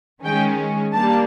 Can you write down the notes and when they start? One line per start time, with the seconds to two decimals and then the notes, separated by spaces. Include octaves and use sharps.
0.23 D#3 G#3 C#4 G5
0.92 G3 A#3 D4 A5